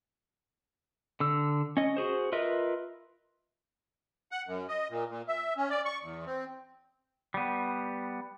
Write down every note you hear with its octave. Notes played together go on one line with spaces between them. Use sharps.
D3 E6
C#4 D#5
F#4 G#4 C5
F4 A#4 B4 D#5 E5
F#5
F#2
D#5
A#2
A#2
E5
C#4
D5
C#6
E2
C4
G3 B3